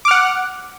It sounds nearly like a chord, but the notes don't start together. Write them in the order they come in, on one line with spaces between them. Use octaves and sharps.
D6 F6 F#5